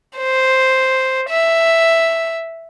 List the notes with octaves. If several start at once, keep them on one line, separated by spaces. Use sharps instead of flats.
C5
E5